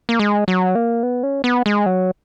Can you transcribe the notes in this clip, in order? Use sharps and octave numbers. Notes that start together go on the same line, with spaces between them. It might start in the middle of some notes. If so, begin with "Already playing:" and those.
A#3
G#3
F#3
A#3
B3
C#4
B3
G#3
F#3